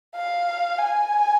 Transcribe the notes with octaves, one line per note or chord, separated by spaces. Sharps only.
F5
G#5